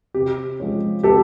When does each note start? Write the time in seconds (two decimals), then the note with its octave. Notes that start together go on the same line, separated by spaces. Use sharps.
0.14 C3 G4
0.60 F3 G#3 C#4
1.03 C3 G4 A4